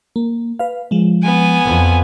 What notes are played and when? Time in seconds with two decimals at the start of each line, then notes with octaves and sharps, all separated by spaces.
0.16 A#3
0.59 B4 F5
0.91 F3 G#3
1.23 B3 G#5
1.64 F2